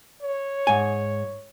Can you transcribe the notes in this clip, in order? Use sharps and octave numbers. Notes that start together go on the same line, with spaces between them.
C#5
G#2 G#5